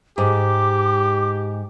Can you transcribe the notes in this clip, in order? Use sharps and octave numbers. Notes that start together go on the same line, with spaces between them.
G#2 G4 D6